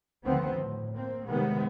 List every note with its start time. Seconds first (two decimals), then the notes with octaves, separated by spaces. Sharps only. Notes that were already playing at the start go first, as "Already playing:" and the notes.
0.24 D2 D3 D#3 F3 B3 C4
0.53 A2
0.95 A#3 C4
1.26 C3 D#3 G3 G#3 B3